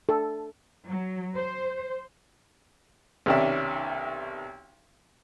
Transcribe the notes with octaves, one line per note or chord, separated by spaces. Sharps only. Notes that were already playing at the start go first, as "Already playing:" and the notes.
A4
F#3
C5
B1 C3 D#3 C#4 D5 E5